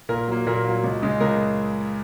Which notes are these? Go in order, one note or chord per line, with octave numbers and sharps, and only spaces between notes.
A#2 A#4
F#3 A#3
A#2 A#4
F#3 A#3
C#2
C#3 G#3
C#2 A#4